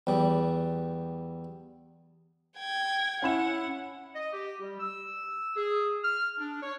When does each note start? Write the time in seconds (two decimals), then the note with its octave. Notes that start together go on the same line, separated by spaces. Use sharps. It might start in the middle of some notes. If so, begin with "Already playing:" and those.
0.07 E2 G3
2.58 G5 G#6
3.22 C#4 E4 F#5 E7
4.15 D#5
4.33 G4
4.60 G3
4.79 E6
5.56 G#4
6.03 F6
6.38 D4
6.62 C#5